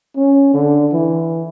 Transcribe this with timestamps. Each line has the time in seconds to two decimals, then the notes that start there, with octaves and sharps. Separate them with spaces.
0.16 C#4
0.54 D3
0.93 E3